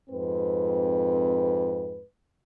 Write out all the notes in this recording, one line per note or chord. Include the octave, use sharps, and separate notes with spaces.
F2 G#2 C4 B4